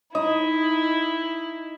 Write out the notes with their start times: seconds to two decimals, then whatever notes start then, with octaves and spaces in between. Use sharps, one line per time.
0.15 D#4 E4 D#5